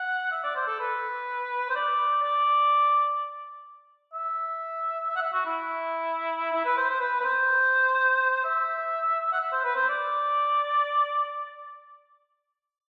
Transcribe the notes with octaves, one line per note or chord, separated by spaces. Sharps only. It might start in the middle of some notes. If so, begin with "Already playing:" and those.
Already playing: F#5
E5
D5
C5
A4
B4
C5
D5
D5
E5
E5
F#5
E5
F#4
E4
E4
B4
C5
C5
B4
B4
C5
E5
F#5
E5
C5
B4
C5
D5